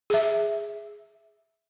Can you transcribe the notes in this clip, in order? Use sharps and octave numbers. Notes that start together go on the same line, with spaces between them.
G#4 E5